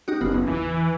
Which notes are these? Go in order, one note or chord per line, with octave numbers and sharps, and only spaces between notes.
D#4 F#4 G4
F#1 B3 D#4 F4
E2
E3